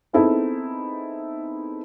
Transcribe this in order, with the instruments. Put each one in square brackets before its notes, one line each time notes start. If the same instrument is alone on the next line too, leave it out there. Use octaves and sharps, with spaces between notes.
[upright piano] B3 C4 D#4 E4 G#4 A4